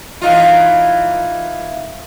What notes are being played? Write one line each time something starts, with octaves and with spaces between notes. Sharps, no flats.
E3 D#4 F4